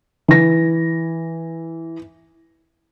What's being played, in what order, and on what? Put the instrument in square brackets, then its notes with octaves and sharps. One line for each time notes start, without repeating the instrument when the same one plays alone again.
[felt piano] E3 A#6